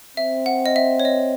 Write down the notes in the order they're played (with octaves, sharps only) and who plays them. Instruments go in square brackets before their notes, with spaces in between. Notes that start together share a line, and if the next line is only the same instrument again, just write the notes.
[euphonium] C4 [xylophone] E5
[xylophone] F#5
D#5
E5
C#5
D#5